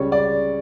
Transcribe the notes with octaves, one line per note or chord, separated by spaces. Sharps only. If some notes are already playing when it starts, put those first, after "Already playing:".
Already playing: C#2 C#3 G3 C#5
D5